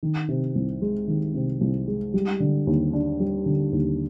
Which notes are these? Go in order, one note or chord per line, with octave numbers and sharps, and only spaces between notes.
D#3
C3
C2
G#3
D#3
C3
C2
G#3
G3
D3
D#2
D4
G3
D3
D#2